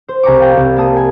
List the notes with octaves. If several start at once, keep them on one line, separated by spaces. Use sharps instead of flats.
C5
C2 G#5 A#5 C#6 D6
F5 G5 A#5
C2
A#3 A5 D#6
G#5